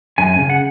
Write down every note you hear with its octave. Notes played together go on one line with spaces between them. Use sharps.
F#2 G#5
C#3 G#5
F#5